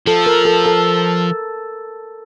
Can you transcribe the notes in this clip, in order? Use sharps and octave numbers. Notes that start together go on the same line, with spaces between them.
F3 A4
A#4
A4
A4